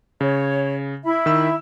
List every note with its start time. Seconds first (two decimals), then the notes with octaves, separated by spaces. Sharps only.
0.21 C#3 C#5
1.05 E4 E5 B5
1.26 D#3 E6